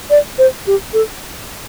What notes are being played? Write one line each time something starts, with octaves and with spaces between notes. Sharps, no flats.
D5
C5
G4
A4